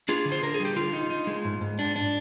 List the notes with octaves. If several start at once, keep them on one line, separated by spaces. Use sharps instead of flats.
D4 F4 G#4
D3
C5
D3 A#4
G#4
G3
G4
D3 F4
D#4
D#4
G#3
G#2
G#2
D4
D4